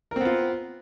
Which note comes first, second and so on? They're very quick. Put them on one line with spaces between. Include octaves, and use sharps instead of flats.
A#4 C4 B3 F4